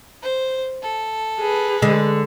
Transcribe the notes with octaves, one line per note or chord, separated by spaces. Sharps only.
C5
A4
G#4 B4
D3 G#3